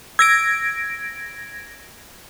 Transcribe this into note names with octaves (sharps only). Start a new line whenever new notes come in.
E6 G#6 A#6 D7